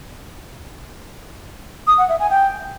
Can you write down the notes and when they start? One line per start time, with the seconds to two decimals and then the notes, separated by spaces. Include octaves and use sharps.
1.87 D#6
1.98 F#5
2.09 E5
2.20 G#5
2.31 G5